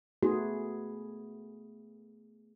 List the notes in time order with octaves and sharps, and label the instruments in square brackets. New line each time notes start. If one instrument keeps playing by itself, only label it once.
[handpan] A3 B3 G#4 [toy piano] F#4